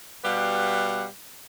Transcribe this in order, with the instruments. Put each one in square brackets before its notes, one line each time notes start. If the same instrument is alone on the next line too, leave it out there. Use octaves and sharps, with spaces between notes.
[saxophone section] B2 G3 G4 B4 F5 F#5